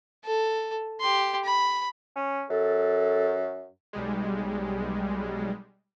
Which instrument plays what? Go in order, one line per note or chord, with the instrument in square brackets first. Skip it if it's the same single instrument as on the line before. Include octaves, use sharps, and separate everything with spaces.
[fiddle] A4
G4 C6
B5
[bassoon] C#4
[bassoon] F#2 [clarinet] A4
[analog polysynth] B1 G3 G#3